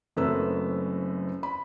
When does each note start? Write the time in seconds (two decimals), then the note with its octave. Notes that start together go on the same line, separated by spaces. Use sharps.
0.16 F#1 F#2 A3 C4 B4 E6
1.43 B5